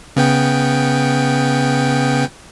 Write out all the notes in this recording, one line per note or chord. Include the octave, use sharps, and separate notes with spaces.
C#3 B3 G5